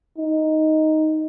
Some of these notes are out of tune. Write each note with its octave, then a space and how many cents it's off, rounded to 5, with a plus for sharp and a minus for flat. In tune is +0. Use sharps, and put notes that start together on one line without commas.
D#4 +5